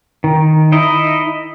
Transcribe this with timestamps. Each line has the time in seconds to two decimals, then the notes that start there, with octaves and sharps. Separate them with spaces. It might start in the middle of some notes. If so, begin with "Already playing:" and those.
0.24 D#3
0.72 D#4 E4 D#5